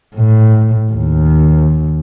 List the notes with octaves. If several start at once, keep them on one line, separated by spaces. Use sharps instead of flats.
A2
D#2